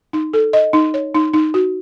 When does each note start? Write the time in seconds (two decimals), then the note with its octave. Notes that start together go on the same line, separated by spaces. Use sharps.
0.13 D#4
0.34 A4
0.53 D#5
0.73 D#4
0.94 C#5
1.15 D#4
1.34 D#4
1.54 F#4